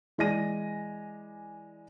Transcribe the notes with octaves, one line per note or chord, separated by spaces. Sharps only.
E3 G#3 D5 G#5 A#6 D#7